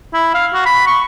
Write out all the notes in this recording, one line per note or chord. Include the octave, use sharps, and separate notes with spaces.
E4
F5
F#4
B5
C#6